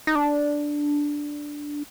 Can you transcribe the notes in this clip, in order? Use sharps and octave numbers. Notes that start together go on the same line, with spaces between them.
D#4
D4